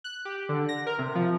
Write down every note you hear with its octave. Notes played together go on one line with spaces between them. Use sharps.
F#6
G4
D3
A#6
A#4
C3
F3